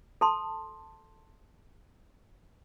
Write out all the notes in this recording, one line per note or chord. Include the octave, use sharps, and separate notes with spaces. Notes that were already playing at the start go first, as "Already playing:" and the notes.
A4 A5 C6